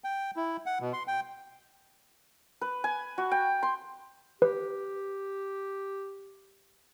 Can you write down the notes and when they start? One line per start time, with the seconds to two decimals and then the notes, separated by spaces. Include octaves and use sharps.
0.04 G5
0.36 E4
0.66 F#5
0.81 B2
0.93 C6
1.08 G5
2.61 B4
2.84 G#5
3.18 F#4
3.31 G5
3.63 C6
4.42 G4 B4